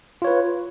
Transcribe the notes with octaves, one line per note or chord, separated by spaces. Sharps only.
F4 B4 C#5